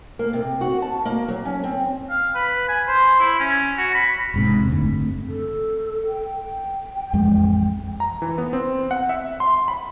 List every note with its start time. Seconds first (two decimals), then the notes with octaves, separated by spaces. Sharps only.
0.19 A#3
0.33 C3
0.61 F#4
0.82 A5
1.05 A#3
1.28 F#3
1.45 C#4
1.64 C4
2.10 F5
2.35 B4
2.68 G#5
2.88 C5
3.19 E4
3.39 C#4
3.78 F#4
3.95 B5
4.34 E1 G#2 C3
4.67 F#1 D3 A3 C4
5.28 A4
6.08 G5
7.13 A1 F2 G#3
8.00 A#5
8.22 E3
8.38 B3
8.53 C4
8.91 F#5
9.09 E5
9.40 C6
9.68 B5